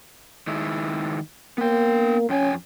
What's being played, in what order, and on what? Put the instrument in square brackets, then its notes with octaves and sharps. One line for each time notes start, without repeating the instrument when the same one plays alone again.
[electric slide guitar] D#3 G#3 E4
[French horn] A#3 [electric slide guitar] B3 G5
[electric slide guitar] F2 G5 G#5 [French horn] C#4